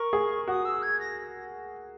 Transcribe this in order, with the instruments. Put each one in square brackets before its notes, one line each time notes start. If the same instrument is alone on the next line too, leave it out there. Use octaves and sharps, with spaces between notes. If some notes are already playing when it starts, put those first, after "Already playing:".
Already playing: [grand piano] A#4 [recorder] C#6
[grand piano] G#4
[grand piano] F#4 [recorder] D#6
[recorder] E6
G#6
A#6